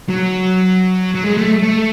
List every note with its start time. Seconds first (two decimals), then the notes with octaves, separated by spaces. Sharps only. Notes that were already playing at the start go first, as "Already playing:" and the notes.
0.09 F#3
1.15 F#3
1.24 G#3
1.37 A3
1.63 A3